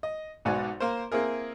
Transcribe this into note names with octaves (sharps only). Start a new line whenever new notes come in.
D#5
B1 G#2 B2 F#4 D5 G#5
A#3 A#4 C5
A#3 C4 E4 G#4 A#4